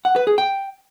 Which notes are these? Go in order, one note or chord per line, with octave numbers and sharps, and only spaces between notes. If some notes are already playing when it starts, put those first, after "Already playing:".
F#5
B4
G#4
G5